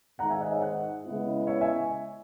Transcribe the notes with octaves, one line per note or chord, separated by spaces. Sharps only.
G#2 D#3 G#3 D#4 G#4 F#5 A#5
E5 G#5
D#5 F#5
C#5 E5
D#5 F#5
C#3 G#3 B3 E4
C#5 E5
E5 G#5